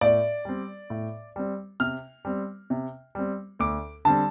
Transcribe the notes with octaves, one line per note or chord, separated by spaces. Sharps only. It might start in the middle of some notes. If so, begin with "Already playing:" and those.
A2 D5
G3 C4
A2
G3 C4
C3 F6
G3 C4
C3
G3 C4
D2 D6
D3 G3 C4 A5